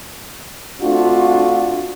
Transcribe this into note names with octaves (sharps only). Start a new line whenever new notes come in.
A3 C4 D4 F4 F#4